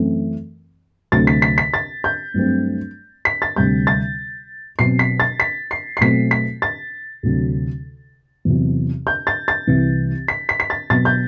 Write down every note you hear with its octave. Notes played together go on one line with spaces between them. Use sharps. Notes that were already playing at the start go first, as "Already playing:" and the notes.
Already playing: F#2 E3 A3 C4
D2 C3 F#3 A3 C4 A6
B6
B6
B6
A6
G6
G2 F#3 A3 C4
B6
A6
D2 C3 G3 C4 G6
A6
B2 F#3 C4 C7
B6
A6
B6
C7
C7
B2 F#3 A3 C4 B6
B6
A6
D2 C3 F#3
E2 C3 F#3
G6
A6
A6
C2 C3 E3
B6
B6
B6
A6
B2 F#3 B3 A6
G6